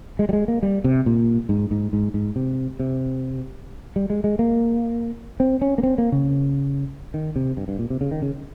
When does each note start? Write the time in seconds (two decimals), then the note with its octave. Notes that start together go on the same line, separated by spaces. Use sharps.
0.19 G#3
0.29 G3
0.33 G#3
0.48 A#3
0.63 G3
0.84 C3
1.06 A#2
1.49 G#2
1.71 G#2
1.93 G#2
2.14 G#2
2.36 C3
2.80 C3
3.96 G3
4.10 G#3
4.24 G#3
4.39 A#3
5.40 C4
5.62 C#4
5.78 A#3
5.83 C4
5.98 A#3
6.12 C#3
7.14 D#3
7.36 C3
7.57 G2
7.68 G2
7.79 A#2
7.90 C3
8.01 C#3
8.11 D#3
8.22 C#3